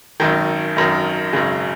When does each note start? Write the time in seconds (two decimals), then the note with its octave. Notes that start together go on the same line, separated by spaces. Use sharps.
0.20 G#1 F#2 D#3
0.76 G#1 F#2 D#3
1.33 G#1 F#2 C#3